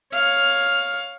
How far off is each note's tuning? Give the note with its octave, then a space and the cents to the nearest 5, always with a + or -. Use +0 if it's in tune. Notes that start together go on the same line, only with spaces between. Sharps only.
C#5 +0 F5 +10